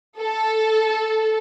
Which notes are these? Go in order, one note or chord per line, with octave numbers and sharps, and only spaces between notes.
A4